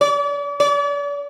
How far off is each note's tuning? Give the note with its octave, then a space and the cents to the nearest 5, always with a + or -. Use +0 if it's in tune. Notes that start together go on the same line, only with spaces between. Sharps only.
D5 -40
D5 -40